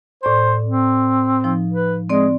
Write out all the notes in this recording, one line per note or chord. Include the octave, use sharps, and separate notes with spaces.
A2 C5 D5 C6
C4
F3 D#4
B4
G#3 C4 D5